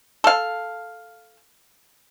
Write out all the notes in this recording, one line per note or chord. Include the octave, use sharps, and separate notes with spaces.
A4 F5